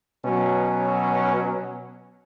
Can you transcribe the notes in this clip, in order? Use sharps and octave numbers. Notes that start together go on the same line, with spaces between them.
B2 F#3 C#4